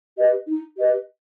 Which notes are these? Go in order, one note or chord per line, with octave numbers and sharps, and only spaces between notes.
G4 B4 D#5
D#4
G4 B4 D#5